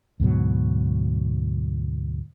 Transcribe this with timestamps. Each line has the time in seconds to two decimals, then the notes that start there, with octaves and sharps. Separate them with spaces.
0.20 D2 G#2 B2 F#3